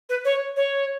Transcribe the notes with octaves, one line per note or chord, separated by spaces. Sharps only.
B4
C#5
C#5